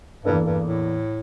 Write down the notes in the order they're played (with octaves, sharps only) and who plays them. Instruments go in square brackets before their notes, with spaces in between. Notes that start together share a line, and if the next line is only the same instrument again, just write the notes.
[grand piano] E2 E3 A#3 D4 A4 [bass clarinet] G2
[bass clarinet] G2
A2